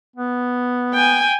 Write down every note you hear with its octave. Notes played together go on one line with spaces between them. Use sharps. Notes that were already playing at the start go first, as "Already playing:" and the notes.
B3
G5 G#5